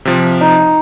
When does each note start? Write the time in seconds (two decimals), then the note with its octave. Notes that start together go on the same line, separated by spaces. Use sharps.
0.05 C3 F3
0.41 D#4